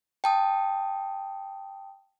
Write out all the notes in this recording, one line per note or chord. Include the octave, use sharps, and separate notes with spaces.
G5 A5 D#6